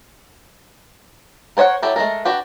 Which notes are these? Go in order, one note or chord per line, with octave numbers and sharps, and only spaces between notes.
A#4 C5 C#5 D#5 F#5
F#3 E4 G4 A4
G#3 A3 C4 A4 A#4
D4 F#4 G4 B4